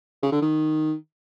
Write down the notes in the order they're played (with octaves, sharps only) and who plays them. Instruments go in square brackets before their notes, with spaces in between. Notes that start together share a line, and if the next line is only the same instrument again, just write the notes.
[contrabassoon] C#3
D3
D#3